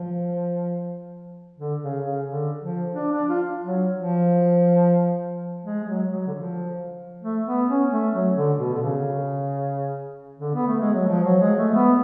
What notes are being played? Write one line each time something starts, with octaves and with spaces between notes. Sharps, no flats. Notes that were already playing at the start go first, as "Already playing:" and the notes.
Already playing: F3
D3
C#3
C#3
D3
F3
D4
D4
F4
F#3
F3
G#3
G#3
F#3
F#3
D3
F3
A3
B3
C#4
A3
F#3
D3
B2
D3
C#3
D3
B3
A3
G#3
F#3
F3
F#3
G#3
A3
B3